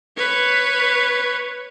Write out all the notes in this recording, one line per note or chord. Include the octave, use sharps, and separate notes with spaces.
B4 C#5